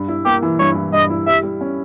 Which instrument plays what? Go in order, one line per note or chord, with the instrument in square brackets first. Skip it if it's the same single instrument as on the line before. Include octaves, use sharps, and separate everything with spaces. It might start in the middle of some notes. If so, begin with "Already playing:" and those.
Already playing: [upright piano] G2
E4
[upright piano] A#3 [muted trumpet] G4
[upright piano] E3
[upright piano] G2 [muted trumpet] C#5
[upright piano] E3
[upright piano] G2 [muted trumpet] D#5
[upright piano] E4
[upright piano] G3 [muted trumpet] E5
[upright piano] G3
C#4